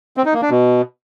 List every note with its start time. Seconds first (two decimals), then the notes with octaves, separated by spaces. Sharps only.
0.17 C4
0.25 D#4
0.34 A#3
0.42 D4
0.50 B2